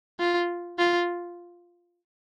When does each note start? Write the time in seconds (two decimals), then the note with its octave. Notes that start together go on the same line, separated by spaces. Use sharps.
0.20 F4
0.79 F4